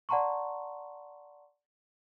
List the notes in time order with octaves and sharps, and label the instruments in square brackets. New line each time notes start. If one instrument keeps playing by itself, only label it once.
[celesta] D5 F#5 A5 A#5 C6 C#6